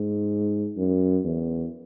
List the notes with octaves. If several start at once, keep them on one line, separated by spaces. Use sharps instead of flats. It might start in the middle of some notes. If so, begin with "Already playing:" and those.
Already playing: G#2
F#2
E2